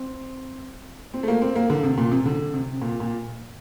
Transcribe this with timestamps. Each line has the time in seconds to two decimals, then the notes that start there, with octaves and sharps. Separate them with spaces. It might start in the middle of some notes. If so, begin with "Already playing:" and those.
Already playing: C4
1.14 C4
1.23 A3
1.28 A#3
1.42 C4
1.56 A#3
1.70 D3
1.84 C3
1.98 A#2
2.11 C3
2.26 D3
2.54 C3
2.82 A#2
3.00 A#2